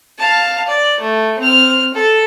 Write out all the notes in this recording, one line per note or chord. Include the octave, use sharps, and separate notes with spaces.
F5 A5
D5
A3
C4 F6
A4